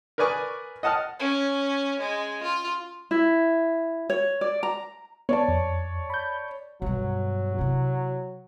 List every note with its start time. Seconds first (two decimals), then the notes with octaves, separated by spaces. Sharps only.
0.18 A#4 B4 D5 G#5 C#6 D#6
0.83 D#5 F#5 A5 D#6 F6
1.19 C#4
2.00 G#3
2.43 F4
3.11 E4
4.10 C#5
4.41 D5
4.63 A#5
5.29 B3 C#5 D5 A5
5.48 F2
6.10 B5 G6
6.82 G2 B2 F#3
7.58 C3 E4